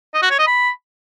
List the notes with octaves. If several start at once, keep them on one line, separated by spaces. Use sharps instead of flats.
D#5
F#4
C#5
D#5
B5